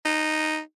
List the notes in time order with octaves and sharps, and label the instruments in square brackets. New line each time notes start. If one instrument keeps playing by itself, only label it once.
[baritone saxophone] D#4